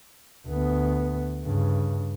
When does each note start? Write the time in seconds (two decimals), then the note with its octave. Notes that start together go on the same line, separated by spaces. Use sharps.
0.48 D2 B3
1.45 G2 C#3